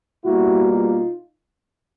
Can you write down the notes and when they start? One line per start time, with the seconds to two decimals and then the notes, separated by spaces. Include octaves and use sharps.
0.24 B2 G3 A#3 E4 F#4
0.70 D#4 F4